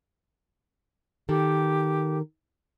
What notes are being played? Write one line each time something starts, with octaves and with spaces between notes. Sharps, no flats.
D#3 G4 A4 A#4